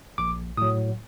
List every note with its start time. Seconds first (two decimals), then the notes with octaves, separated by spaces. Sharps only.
0.18 A#1 D6
0.57 A2 F#3 D#6